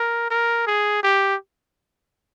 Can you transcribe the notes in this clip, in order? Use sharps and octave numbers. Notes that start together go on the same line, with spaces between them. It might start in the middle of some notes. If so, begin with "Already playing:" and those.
Already playing: A#4
A#4
G#4
G4